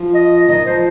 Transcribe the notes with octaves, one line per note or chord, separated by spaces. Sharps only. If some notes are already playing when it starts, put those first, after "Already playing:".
Already playing: F3
D#5
D#3 D#5
F3 C5